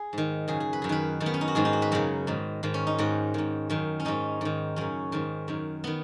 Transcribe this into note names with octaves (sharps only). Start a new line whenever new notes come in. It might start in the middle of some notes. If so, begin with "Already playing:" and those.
Already playing: G#4
G#2 D#3
F#2 C#3 G#4
G#4
B4
F#2 G#4
D#3 B4
F#2 D#3
B3
C#4
D#4
F#4
G#2 D#3 G#4
D#4
F#4
B4
F#2 C#3 F#4
G#2 D#3
G#2 D#3
C#4
D#4
G#2 D#3 F#4
G#2 D#3
F#2 D#3
C#4
G#2 D#3 D#4
G#2 D#3
F#2 C#3 C#4
G#2 D#3
F#2 D#3
D#3 B3